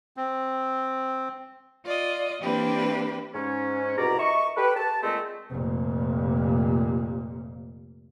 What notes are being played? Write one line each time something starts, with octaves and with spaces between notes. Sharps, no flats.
C4
F4 D5 D#5
E3 A#3 C4 D4 G4 B4
G#2 C#4
C2 B2 D5 A#5
D#5 E5 C#6
G4 A4 B4
A5
A#2 G#3 A3 C4 D#5
F1 A#2